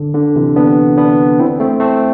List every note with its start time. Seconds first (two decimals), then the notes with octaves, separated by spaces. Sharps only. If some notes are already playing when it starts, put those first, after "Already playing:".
Already playing: D3
0.14 D3
0.36 C3 E3
0.56 B3 D4
0.97 B3 D4
1.39 C4 E4
1.60 A3 C4
1.80 A3 C4